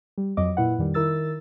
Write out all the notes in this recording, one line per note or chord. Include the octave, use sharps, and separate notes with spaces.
G3
F2 F#3 D#5 D6
A#2 E4 B4 F#5
F2 D#3 G3
D#3 E4 A#4 E6 A6